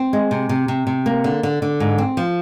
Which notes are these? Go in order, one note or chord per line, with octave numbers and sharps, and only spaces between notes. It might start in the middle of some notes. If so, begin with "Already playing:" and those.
Already playing: C4
G#3
C3
C3
C3
C3
A#3
D3
D3
D3
G#2
C4
F3